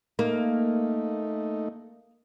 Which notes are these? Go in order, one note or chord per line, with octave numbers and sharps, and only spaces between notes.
A3 A#3 D#4